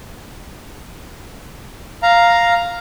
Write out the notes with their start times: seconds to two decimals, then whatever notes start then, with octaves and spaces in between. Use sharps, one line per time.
2.03 F5 A#5